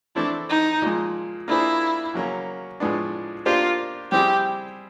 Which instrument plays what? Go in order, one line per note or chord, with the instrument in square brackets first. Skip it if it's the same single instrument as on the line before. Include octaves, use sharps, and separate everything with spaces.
[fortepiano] E3 A3 C4 E4 [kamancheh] D4
[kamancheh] D#4
[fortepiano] A#2 F3 G#3
[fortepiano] A#3 D4 F4 G#4 C5 [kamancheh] E4
[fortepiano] C#3 F#3 A#3 C#4
A2 F3 G#3 B3 D4
[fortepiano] A#3 D4 G4 C5 [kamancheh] F4
[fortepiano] G3 C4 E4 G#4 [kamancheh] G4